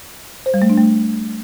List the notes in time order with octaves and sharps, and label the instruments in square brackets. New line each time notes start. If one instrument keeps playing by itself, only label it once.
[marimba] C5
G3
A3
D4
A3